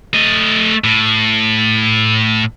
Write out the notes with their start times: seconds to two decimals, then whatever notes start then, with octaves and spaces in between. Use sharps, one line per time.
0.14 A3 D#5
0.84 A2